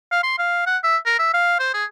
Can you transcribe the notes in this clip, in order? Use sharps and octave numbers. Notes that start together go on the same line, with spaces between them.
F5
C6
F5
F#5
E5
A#4
E5
F5
C5
G#4